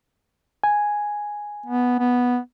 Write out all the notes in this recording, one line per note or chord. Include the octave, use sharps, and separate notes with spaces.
G#5
B3
B3